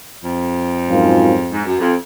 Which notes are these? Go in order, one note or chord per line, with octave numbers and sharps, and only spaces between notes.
F2
G#2 F#3 C#4 F4 A#4
G#2
F#2
F2